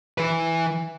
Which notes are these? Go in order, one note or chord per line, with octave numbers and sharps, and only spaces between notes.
E3 B4